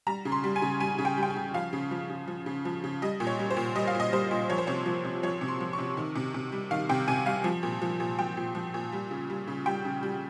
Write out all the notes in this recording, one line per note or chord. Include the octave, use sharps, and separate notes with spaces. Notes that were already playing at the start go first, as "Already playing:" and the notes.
G3 A#5
C#3
C6
G3
G#5
C#3
G3 G#5
C#3
G5
G3
G5
G#5
C#3
F3 F5
C#3
F3
C#3
F3
C#3
F3
C#3
G3 D#5
A#2
C#5
G3
C5
A#2
G3 D#5
F5
A#2
D#5
G3 C5
A#2
F3 C#5
C5
C3 C#5
F3
C3
F3 C#5
C3
C6
F3
C#6
C3
D#3
C3
C3
G3
D#3 F5
C3 G5
C3 G#5
G3 F5
F3
A#2
F3
A#2
F3 G5
A#2
F3
A#2
G3
C#3
G3
C#3
G3 G5
C#3
G3